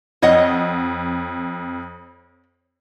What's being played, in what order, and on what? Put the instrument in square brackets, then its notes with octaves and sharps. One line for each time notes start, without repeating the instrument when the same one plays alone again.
[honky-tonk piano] F2 [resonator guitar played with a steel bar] C#5 D#5 F#5